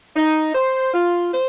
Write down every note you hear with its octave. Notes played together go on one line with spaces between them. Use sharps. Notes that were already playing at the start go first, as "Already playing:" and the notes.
D#4
C5
F4
C5